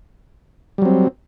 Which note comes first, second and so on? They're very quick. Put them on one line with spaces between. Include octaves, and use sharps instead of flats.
G3 F#3 C4